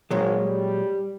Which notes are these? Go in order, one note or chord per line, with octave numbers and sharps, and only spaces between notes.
G#1 A#2 F#3 G#3
G3